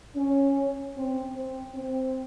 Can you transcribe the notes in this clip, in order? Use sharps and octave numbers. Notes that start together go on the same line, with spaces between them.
C#4
C4
C4
C4